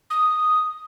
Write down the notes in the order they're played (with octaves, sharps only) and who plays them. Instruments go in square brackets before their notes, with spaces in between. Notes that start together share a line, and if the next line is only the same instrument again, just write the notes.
[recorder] D#6